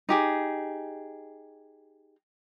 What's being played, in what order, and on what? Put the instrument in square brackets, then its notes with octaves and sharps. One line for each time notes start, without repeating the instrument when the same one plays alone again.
[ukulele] D#4 G4 G#4